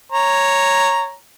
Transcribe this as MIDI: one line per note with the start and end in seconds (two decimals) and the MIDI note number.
0.12 1.13 73
0.12 1.13 82